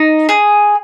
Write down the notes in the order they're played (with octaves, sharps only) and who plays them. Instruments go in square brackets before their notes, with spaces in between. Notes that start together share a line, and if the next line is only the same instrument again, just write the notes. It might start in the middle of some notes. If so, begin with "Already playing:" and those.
Already playing: [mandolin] D#4
G#4